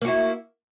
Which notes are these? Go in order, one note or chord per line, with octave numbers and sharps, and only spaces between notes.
A#3 E4 F#4